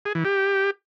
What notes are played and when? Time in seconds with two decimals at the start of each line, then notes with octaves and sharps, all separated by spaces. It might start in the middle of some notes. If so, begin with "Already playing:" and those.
0.05 G#4
0.15 E3
0.25 G4